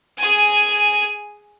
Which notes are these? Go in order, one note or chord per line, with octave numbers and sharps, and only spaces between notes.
G#4 G#5